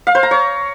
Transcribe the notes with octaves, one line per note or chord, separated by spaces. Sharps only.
F5
C5
A#5
C#5